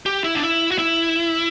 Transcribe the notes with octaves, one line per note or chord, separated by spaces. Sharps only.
G4
E4
D4
E4
F#4
E4